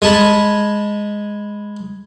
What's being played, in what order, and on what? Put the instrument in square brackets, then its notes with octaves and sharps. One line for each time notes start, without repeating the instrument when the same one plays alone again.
[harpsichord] G#3 G#4 A5 B5